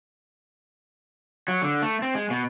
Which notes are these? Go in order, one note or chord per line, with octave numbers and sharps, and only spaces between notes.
F#3
D3
A3
C4
G#3
B2